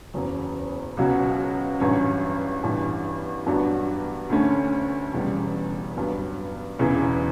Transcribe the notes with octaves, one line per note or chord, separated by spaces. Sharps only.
F#1 E2 C#3 F#3
C#2 B2 F#3 C#4 F#4
A1 G2 F#3 C#4
A1 G2 E3 B3
G2 F#3 B3 D4 F#4
D2 D3 A3 C#4
E1 E2 C#3 G3
G2 F#3 B3
E1 E2 C#3 E3